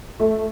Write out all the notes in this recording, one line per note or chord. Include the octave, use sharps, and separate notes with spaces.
A3